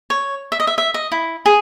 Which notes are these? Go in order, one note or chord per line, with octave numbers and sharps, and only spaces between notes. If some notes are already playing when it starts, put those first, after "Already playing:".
C#5
E5
D#5
E5
E5
D#5
E4
G#4